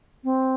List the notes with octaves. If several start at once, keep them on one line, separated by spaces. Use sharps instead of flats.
C4